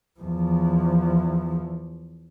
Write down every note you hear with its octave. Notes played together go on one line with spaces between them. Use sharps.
E2 F3